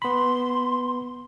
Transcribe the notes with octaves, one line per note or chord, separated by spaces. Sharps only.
B3 B5 C6